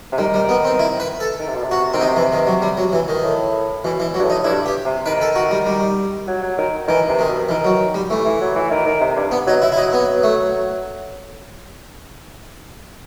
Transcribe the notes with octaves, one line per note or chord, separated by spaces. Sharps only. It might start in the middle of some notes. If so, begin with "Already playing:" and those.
C3
D#3 G3
G3
B3
C4
E4
B4
A4
D#3
C3
B2
C3
F#4
D#3 C4
C3 D#4
E3
D#3
F#3
G3
F#3
E3
D#3
A2
B2 E3
E3
F#3
G2
A2
D#4
G2 E4
G4
C3
D#3 B4
A4
F#4
G3
G3
F#3
F#3
D#3
D#3 E3
C3
D#3
B2
D#3 E3
F#3
G3
E3 A3
E3
F#3
E3
D#3
D#3
C3
G2
B3
F#3 D#4
E4
E4
F#3 D#4
B3
A3